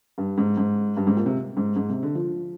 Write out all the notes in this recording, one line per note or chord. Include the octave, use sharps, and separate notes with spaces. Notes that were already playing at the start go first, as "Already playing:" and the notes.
G2
G#2
G#2
G2
G#2
A#2
C3
G#2
G#2
C3
D3
F3